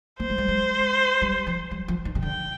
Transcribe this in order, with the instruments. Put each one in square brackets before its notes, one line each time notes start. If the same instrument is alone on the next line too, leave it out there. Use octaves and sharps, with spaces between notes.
[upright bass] A#3 [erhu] C5
[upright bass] G#3
G3
G#3
G3
F3
G3
F3
D#3
C3
[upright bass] D3 [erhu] G5